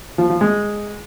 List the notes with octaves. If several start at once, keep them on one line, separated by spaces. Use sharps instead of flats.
F3
F3
G#3